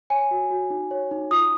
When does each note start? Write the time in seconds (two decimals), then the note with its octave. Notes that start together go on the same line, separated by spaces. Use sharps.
0.10 C#5 G#5
0.31 F#4
0.51 F#4
0.70 D#4
0.91 C#5
1.11 D#4
1.31 F4 D#6